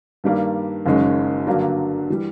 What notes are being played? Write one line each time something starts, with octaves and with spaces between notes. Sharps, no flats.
G2 D#3 G3 A#3 D4
F#1 F#2 D#3 G#3 C#4
G2 D3 F#3 A#3 D4
E3 G3